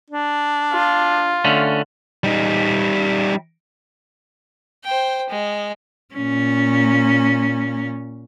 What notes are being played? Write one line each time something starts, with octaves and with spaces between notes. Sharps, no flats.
D4
F4
D3 A3 C#4
G3 D#4
C5 G5
G#3
A#2 C#4